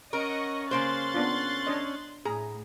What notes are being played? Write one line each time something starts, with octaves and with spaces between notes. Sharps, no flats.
C#4 A#4 D#5 F#5 C#6
C#3 A#3 C5 C6 F#6 A6
B3 D4 F4
D4 C#5 D#5
A2 G#4 A#5